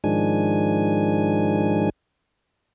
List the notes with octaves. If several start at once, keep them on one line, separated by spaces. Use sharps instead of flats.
G#2 D#3 F3 G#3 D4 G#5